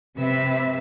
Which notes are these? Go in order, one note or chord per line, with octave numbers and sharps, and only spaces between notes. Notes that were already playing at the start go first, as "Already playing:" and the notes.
C3 C4 B4 E5